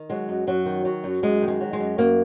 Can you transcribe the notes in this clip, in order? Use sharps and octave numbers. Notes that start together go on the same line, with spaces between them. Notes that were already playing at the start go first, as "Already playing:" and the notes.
Already playing: D#3
F#3 G#3
F#2
F#2 F#3
D#3
F#3
F#2
F#2 G#3
D#3
G#3
F#3
G#3
F#2
F#2 A#3